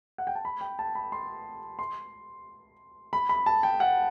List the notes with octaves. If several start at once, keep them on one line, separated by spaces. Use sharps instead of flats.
F#5
G5
A5
B5
G5
A5
B5
C6
C6
B5
B5
A5
G5
F#5